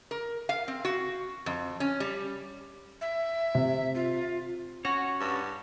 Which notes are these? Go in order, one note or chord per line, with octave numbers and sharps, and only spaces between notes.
A#4
F5
C4
F#4
F2
C#4
G3
E5
C3
F4
C#4 F#4 C#5
G2